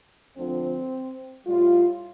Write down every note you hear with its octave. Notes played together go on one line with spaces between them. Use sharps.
D2 D3 F3 C4
A2 G3 F4